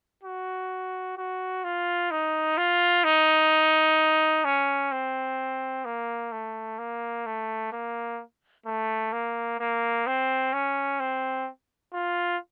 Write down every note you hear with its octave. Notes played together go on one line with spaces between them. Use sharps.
F#4
F#4
F4
D#4
F4
D#4
C#4
C4
A#3
A3
A#3
A3
A#3
A3
A#3
A#3
C4
C#4
C4
F4